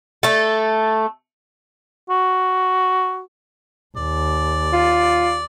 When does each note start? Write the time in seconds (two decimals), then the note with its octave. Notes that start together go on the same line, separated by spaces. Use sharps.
0.23 A3 A4
2.10 F#4
3.97 D#2 D5
4.73 F4